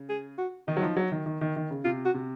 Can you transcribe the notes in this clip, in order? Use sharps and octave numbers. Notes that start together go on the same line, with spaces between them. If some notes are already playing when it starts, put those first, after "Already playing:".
Already playing: C#3
G#4
F#4
D#3 D#4
F#3
F3
F#3
D#3
D#3
D#3
D#3
C#3
C3 F4
F#4
C3